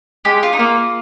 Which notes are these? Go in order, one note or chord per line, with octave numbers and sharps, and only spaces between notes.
G#3 G4
F4
D#4
A#3 F4